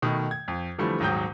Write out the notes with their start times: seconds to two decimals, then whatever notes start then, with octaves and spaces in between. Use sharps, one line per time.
0.02 B2 D#3 A3
0.31 G#6
0.48 F2
0.78 D3 E3 F3 G3 A3
1.00 D#1 G#2 F#3 G5 D#6 G6